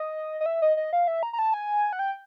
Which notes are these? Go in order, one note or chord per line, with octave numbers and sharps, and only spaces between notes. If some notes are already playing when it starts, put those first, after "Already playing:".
Already playing: D#5
D#5
E5
D#5
D#5
F5
E5
A#5
A#5
A5
G#5
F#5
G5